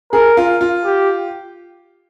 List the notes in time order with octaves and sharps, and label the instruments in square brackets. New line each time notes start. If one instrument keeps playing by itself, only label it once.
[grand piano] G#4 [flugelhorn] A#4
[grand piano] F4
F4
[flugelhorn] G4